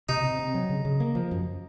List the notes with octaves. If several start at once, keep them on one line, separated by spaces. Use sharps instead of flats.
C3 D#4
C3
C4
F#3
C#3
C#3
A#3
F3
F#2